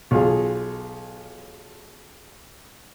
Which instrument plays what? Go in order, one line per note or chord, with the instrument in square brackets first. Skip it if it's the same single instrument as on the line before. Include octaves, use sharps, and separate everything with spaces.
[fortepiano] B1 F4 G#4